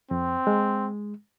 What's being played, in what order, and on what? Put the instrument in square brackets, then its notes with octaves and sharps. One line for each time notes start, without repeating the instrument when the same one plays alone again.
[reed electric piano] F2 [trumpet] C4
[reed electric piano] G#3